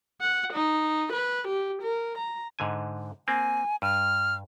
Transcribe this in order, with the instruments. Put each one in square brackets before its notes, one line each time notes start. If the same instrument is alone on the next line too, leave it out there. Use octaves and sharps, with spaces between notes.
[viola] F#5
D#4
B4
G4
A#4
A#5
[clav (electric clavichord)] G#2 D3 G#5
[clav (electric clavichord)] A#3 C4 [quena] G#5
[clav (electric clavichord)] G2 [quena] F6